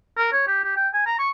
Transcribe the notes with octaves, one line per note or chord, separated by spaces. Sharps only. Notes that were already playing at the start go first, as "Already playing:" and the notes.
A#4
C#5
G4
G4
G5
G#5
A#5
C#6